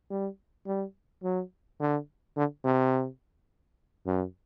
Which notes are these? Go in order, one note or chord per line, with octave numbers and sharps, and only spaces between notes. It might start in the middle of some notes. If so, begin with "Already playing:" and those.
G3
G3
F#3
D3
D3
C3
F#2